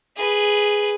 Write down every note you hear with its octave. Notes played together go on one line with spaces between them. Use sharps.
G#4 B4